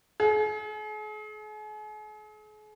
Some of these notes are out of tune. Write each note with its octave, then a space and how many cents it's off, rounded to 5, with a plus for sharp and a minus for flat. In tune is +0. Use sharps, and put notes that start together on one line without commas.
G#4 +40